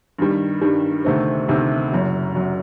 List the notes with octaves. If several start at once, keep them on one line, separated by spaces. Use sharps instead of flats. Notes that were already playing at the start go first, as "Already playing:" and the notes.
G2 D#3 G3
G2 D#3 G3
D2 C3 D#3 A3 C4
D2 C3 D#3 A3 C4
F#1 F#2 F#3
F#2 F#3